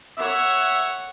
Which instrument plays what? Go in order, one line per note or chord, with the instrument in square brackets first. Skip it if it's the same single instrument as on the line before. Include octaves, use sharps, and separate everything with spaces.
[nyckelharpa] C#5 F#5 [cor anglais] E5